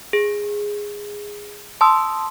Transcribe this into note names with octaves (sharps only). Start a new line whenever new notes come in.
G#4
A5 C6 D#6 E6